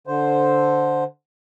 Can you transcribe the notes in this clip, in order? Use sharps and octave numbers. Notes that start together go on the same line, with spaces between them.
D3 C5